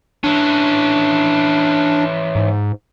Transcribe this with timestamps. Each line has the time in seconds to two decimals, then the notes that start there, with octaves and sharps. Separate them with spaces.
0.24 E3 C#4 D4
2.35 G#2